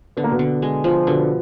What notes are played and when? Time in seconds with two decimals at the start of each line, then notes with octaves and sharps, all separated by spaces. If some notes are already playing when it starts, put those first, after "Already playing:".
0.17 D3 B3
0.24 A#3
0.32 B2 B3
0.39 D3
0.62 G#3
0.84 F3
1.07 B2 D3 B3